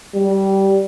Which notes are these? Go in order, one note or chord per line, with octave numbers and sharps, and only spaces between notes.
G3